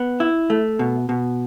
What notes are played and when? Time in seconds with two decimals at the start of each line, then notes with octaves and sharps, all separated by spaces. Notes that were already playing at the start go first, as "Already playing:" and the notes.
Already playing: B3
0.20 E4
0.50 A3
0.79 B2
1.09 B2